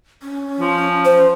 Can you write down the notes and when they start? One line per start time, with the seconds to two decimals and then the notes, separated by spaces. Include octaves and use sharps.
0.23 C#4
0.60 F3
1.05 C5